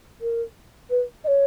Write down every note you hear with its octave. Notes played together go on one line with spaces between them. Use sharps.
A#4
B4
D#5
C#5